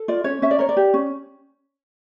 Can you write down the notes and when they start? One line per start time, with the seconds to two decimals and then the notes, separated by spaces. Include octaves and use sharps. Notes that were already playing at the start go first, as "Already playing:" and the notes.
Already playing: A4
0.08 F4 D5
0.24 C#4 C#5
0.42 C#4 E5
0.51 D5
0.59 A#4 C#5
0.69 D5
0.77 G4
0.94 C#4